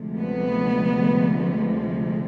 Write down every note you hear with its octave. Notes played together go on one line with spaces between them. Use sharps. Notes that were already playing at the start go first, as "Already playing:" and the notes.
Already playing: D2 C3 F3 G#3
B3